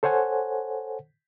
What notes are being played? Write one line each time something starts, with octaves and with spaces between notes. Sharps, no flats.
A4 C5 C#5 F#5 G#5